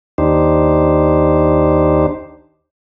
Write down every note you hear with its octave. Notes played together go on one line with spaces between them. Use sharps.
D#2 D4 D#4 G4 C5